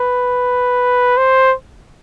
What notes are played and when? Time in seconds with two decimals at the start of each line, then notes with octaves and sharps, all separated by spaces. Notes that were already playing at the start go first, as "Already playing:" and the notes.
Already playing: B4
1.17 C5